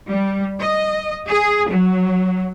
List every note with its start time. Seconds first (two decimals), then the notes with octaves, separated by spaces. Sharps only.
0.10 G3
0.61 D#5
1.28 G#4
1.68 F#3